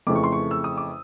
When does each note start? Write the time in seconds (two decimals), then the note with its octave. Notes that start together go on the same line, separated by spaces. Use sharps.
0.07 F2 C#3 E3 A3 D6
0.15 C#6
0.24 C6
0.32 C#6
0.51 E6
0.64 D#6
0.77 D6